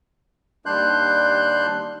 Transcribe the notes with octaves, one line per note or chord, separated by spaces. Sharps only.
D#2 G3 D4 C6 F#6 G6